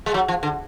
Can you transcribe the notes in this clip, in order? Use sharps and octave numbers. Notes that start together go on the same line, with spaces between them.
G#3
F#3
F3
D3